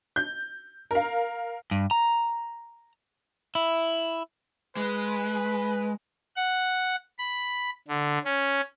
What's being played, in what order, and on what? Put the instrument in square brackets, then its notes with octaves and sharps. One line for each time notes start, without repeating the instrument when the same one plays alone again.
[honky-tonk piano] G6
A#4 F5
[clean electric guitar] G2
A#5
E4
[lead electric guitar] G#3 [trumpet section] B4
[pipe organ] F#5
B5
D3
C#4